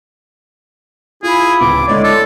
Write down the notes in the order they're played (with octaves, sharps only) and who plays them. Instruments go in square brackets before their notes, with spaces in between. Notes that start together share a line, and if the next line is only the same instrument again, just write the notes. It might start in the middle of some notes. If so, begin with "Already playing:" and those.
[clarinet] E4 [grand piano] F4 [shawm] G#4
[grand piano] D1 C#2 B3 [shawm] D6
[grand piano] D3 A3 C#5 [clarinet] G#3 [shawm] D5
[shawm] A4